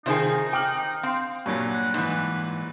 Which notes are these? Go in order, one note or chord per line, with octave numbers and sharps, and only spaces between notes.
C3 D#3 D#4 F4 G#4 C5 G5
G5 D6 F6 F#7
C4 F5
G2 A#2 F#3 C#5
F#5
G#2 E3 B4